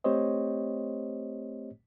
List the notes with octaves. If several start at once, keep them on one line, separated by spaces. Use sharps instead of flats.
A3 C4 G4 C5 C#5 D#5